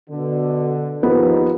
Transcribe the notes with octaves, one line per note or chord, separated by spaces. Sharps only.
B2 D3
D#2 G#2 F3 B3 D#4